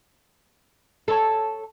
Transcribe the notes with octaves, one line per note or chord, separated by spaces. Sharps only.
A4 C#5